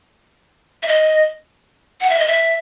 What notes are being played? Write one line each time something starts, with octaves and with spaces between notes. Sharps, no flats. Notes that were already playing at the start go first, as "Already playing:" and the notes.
E5
D#5
F#5
E5
D#5
E5